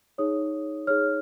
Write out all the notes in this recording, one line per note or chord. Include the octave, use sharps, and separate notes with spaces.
D#4 G#4 C#5 D#6
D#4 G#4 C#5 F6